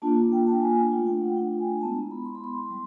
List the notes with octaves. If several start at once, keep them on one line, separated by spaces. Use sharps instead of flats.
A#3 D4 F4 A5
G5
A5
G#5
G5
A3 D4 F4 G5
G5
F#5
G5
G#5
G#3 B3 E4 A5
A#5
B5
C6
B5
C6
G3